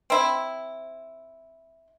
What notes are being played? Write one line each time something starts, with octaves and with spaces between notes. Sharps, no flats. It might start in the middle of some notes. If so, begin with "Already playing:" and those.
C4 E4